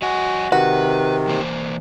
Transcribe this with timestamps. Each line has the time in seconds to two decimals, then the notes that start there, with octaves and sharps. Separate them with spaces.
0.02 F#3 F#4 D#5 G#5
0.52 C3 D#3 F#4 B4
1.28 E3 A#3 C5